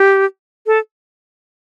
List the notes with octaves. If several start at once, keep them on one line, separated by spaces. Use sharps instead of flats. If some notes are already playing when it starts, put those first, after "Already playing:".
Already playing: G4
A4